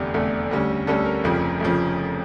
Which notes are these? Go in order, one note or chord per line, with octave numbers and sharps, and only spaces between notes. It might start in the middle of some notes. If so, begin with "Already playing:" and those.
Already playing: F1 E2 D3 A3 G4
F1 E2 D3 A3
D2 D3 G3 C#4
D2 D3 G3 C#4 A4
A#4
F1 F2 C#3 F3
F1 F2 C#3 F3